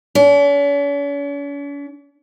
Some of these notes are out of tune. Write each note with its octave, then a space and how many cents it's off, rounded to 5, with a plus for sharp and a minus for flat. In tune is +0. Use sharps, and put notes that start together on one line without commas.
C#4 +45